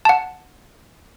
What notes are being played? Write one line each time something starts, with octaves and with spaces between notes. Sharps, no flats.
F#5 A5